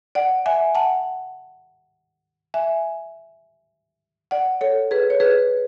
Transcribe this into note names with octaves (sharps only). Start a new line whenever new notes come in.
D5 F#5
E5 G#5
F#5 A5
E5 G#5
D5 F#5
A4 C#5
G#4 B4
C#5
G#4 B4